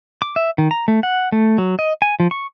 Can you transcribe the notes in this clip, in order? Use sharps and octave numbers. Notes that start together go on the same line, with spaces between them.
D6
E5
D#3
A#5
A3
F#5
A3
F#3
D#5
G#5
F3
C#6